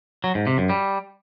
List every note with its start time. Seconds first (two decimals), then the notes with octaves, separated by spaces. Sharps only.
0.24 F#3
0.35 G#2
0.47 C3
0.58 F#2
0.69 G3